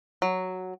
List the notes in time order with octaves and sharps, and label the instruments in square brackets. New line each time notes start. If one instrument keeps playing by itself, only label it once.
[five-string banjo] F#3